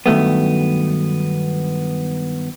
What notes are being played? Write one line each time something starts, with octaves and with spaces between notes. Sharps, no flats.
G2 D#3 F#3 A3 B3